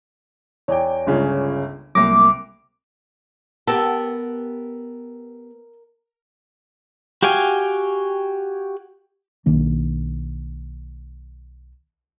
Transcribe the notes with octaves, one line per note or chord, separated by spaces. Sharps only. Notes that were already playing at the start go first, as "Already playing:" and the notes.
E2 C#5 D5 G5 G#5
G1 C#2 C#3
C2 F#3 A3 A#3 D6 A#6
B3 G4 A4 A#4
F#4 G4 F5 G5 G#5
B1 D#3 A#3 D4